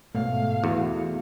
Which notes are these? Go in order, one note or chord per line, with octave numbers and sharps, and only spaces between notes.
G#2 B2 A3 F5
E2 F4 F#4